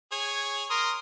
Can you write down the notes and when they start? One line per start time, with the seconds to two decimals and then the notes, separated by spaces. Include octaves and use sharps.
0.12 G#4 C#5
0.70 A#4 C6 D#6